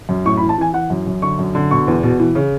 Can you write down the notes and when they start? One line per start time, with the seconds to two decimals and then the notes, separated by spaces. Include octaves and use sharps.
0.09 F#2
0.25 A2 C#6
0.37 B5
0.42 E3
0.49 A5
0.58 E3 G#5
0.73 E3 F#5
0.90 F#2
1.07 F#2
1.22 D3 C#6
1.39 F#2
1.55 D3
1.71 B2 C#6
1.87 E2
2.03 B2
2.19 E3
2.35 C#3